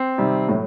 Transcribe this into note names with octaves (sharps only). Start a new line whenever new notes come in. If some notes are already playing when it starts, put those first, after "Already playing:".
Already playing: C4
C3 D#3 G3
A2 F#3